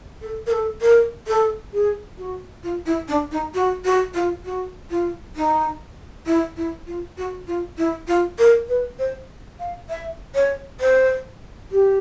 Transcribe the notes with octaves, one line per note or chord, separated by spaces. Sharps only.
A4
A#4
A4
A#4
A4
G#4
F#4
F4
E4
D4
D#4
F#4
F#4
F4
F#4
F4
D#4
E4
E4
F4
F#4
F4
E4
F4
A#4
B4
C5
F5
E5
C#5
C5
G4